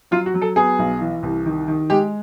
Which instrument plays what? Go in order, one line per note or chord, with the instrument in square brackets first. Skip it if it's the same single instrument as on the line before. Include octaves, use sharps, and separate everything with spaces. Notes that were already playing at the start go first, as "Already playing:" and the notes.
[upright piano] F#3 F4
F#4
F#3
A4
B3 G#4
B1
E3
C2
D#3
D#3
G#3 G4